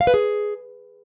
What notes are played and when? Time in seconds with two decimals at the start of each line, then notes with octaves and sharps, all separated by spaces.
0.01 F5
0.07 B4
0.14 G#4